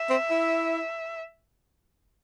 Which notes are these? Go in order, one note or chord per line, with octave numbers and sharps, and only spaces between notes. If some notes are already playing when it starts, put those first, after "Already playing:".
Already playing: E5
C4
E4